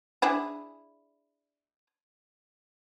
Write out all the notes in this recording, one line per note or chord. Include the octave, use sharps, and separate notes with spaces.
D4 E4 G#4